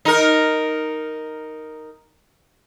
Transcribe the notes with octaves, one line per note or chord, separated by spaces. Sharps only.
D#4 A#4